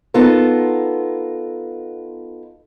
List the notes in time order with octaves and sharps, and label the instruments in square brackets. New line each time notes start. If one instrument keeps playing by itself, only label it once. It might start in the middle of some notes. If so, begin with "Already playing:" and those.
[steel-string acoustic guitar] B3 D#4 F4 A4 A#4